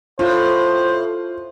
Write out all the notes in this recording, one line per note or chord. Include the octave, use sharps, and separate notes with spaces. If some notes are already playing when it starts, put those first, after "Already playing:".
A2 F4 C5